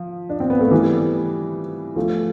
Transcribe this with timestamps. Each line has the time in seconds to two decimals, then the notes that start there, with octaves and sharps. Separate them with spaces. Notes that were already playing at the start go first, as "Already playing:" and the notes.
Already playing: F3
0.30 D4
0.40 C4
0.50 B3
0.61 A3
0.71 E3 G3
1.96 F3 A3